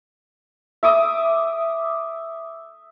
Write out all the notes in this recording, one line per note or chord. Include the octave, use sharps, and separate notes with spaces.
E5 D6 D#6